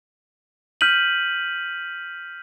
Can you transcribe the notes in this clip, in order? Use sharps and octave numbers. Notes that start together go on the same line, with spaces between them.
F6 G6 B6 D#7 F#7